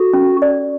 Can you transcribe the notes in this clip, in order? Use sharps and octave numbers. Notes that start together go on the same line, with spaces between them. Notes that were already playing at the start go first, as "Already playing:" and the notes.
Already playing: F#4 A4
C#4
D5